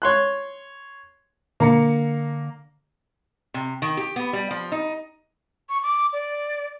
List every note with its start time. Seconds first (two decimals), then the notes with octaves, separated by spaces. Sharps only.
0.02 C#5 C6 F#6
1.60 D3 A#3 A#5 C#7
3.54 C3
3.82 D#3
3.97 G4
4.16 B3
4.33 G3
4.51 F3
4.72 D#4
5.69 C#6
5.83 D6
6.13 D5